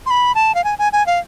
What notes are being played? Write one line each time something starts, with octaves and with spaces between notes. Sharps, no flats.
C6
B5
A5
F5
G#5
G#5
G#5
F5